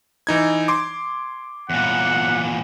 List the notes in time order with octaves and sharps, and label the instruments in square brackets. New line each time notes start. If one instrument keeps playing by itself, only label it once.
[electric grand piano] E3 D#4 G#6
C6 D6
[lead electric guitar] E2 A#2 [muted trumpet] F#5